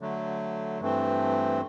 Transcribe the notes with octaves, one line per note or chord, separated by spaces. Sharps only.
D3 F#3 A3
G2 E3 A3 C4